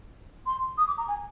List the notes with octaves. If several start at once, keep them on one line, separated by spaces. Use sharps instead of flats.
C6
D#6
D6
A#5
G#5